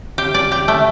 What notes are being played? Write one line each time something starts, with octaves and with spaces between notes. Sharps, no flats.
G4
D5
G4
A3